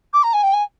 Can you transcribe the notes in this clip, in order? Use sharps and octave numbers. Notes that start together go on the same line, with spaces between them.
D6
A#5
G#5
G5
G#5